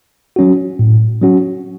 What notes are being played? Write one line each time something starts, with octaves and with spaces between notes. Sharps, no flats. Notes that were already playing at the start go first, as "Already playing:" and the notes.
F#3 C#4 F#4
A2
F#3 C#4 F#4